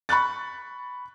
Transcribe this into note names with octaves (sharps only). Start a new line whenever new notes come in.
B5 C#6 F#6 A6